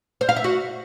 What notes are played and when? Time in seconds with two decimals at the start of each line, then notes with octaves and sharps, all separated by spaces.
0.21 C5
0.29 F5
0.36 E5
0.44 F#4